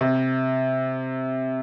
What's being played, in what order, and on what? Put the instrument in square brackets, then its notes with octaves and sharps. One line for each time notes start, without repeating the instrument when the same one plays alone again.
[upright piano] C3